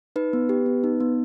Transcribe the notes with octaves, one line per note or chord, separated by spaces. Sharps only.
D#4 B4
B3
G4
B3
D#4
B3